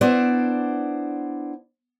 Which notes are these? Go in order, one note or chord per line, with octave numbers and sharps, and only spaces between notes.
B3 D4 E4 C5 D5